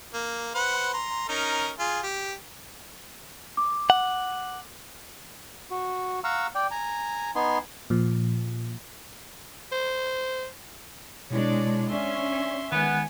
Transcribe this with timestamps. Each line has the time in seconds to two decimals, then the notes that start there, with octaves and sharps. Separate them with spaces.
0.14 A#3
0.55 B4 C5 F#5
0.94 A#5 C6
1.29 C#4 D#4 A#4
1.79 F4 G#4
2.03 G4
3.57 D6
3.90 F#5
5.71 F#4
6.24 F5 F#5 A#5 C#6 E6
6.55 D5 G5
6.71 G#5 A#5
7.35 B3 D#4 G#5 C6
7.90 A#2 F3
9.72 C5
11.31 B2 G#3 D4 E4 C#5 D5
11.89 C#4 D4 D5 E5 C6
12.72 D#3 G#3 B3 G#5